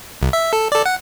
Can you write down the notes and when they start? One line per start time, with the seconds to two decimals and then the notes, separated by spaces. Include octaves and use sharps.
0.22 C2
0.33 E5
0.53 A4
0.72 A4 D5
0.86 F#5